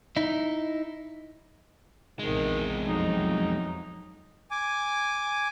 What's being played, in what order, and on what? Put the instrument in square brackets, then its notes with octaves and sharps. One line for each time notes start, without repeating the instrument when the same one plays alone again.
[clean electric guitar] D#4 E4
[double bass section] A#1 C3 E3 [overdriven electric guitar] E2 G#3 [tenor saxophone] D#3
[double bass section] F2 F3 F#3 [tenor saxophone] D#4
[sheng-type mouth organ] G#5 D6